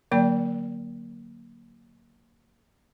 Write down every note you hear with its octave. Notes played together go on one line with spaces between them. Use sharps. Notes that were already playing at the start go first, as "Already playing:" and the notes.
D3 F#3 A#3 D5 G5